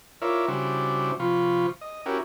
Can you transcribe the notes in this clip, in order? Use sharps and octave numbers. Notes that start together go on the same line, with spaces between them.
E4 F4 A#4 C#5 D5 E5
C#3 G3 D4 E4 F#4 C5
C3 F3 F4 B5 C#6
D#5
C#4 E4 F#4 G4 A#4